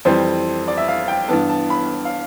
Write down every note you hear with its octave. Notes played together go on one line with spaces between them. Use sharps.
F2 E3 G3 C4 C5
D5
E5
F5
G5
G2 E3 B3 A5
A5
B5
F5